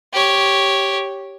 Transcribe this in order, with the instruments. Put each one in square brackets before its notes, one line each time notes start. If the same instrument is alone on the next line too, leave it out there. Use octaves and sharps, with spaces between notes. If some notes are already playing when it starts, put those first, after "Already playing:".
[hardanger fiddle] G4 C#5